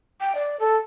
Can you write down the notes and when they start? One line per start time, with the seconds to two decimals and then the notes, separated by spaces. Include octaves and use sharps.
0.20 G5
0.35 D5
0.60 A4